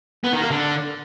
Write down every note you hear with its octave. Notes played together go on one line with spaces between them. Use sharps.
B3
D#3
A#3
D3